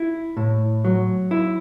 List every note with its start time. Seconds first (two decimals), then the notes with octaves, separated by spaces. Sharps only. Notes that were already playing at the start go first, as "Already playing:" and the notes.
Already playing: E4
0.37 A2
0.85 F#3
1.31 E4